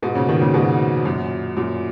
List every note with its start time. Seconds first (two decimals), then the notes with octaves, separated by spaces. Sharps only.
0.02 G#2 B2
0.15 A#2 C#3
0.28 B2 D#3
0.41 A#2 C#3
0.54 G#2 B2
1.05 F#2 A#2
1.57 F#2 A#2